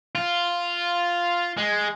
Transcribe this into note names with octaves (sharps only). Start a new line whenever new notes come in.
F4
G#3